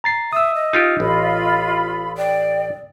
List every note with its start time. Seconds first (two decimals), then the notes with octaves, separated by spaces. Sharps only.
0.04 A#5 A6 C7
0.33 E5 D#6 E6
0.55 D#5
0.73 D#4 F4 G4
1.00 A1 F4 B5
2.17 D5 G5